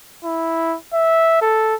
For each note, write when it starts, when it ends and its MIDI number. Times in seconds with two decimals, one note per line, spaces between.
0.24 0.76 64
0.93 1.40 76
1.42 1.75 69